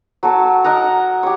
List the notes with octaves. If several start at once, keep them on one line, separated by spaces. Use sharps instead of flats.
F#3 A4 A5 C#6
A#4 D#5 F#5 A#5
G4 C#5